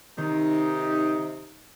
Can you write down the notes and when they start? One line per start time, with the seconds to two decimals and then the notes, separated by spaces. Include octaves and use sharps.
0.18 C3 D#3 D#4